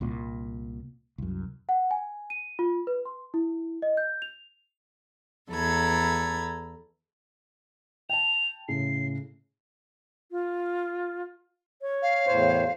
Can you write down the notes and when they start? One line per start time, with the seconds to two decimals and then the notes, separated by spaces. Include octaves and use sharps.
0.01 C2 A#2
1.18 C2 F#2
1.69 F#5
1.91 G#5
2.30 D#7
2.59 F4
2.87 B4
3.05 C6
3.34 E4
3.82 D#5
3.97 G6
4.22 F7
5.51 E2 A4 A#5 B5 G#6
8.10 G5 A5 F7
8.68 A2 C#3 C7
10.31 F4
11.82 C#5
12.02 F5
12.26 E2 A2 C5